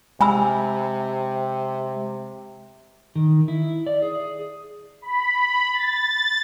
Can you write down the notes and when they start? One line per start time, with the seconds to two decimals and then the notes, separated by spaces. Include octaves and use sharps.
0.21 C3 G#3 G#5 B5 E6
3.16 D#3
3.48 E4
3.87 D5
4.02 G#4
5.02 B5
5.73 A6